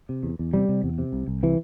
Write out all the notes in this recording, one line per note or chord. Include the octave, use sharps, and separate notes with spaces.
C3
E2
E2
C3 G3
C3
E2
C3
C2
C2
C3 E3